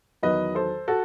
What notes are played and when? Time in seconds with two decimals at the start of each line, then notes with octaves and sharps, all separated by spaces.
0.23 E2 D#3 F#3 B4 D#5
0.55 A4 C5
0.88 F#4 A4